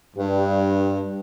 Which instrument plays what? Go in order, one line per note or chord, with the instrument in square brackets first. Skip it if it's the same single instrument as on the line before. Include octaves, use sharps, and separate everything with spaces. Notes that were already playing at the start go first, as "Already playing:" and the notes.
[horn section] G2